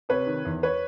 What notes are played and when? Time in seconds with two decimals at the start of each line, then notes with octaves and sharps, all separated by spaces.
0.09 C3 B4 C#5
0.27 D#3
0.45 E2
0.63 B4 C#5